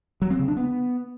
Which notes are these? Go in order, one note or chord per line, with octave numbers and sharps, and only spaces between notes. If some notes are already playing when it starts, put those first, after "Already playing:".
F#3
C4
C#3
D4
B3